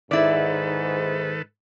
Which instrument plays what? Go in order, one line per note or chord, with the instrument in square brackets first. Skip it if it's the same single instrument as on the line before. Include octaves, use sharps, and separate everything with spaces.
[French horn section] G#2 [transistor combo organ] D#3 A4 B4 [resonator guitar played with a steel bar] E4 D5